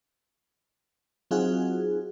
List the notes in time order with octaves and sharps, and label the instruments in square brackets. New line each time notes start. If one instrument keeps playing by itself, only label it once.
[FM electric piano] F#3 C4 D#4 F4 F#4 G#4